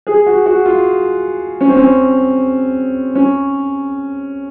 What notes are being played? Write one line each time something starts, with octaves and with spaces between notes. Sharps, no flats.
G#4
F#4
F#4
F4
C#4
C4
C#4
C#4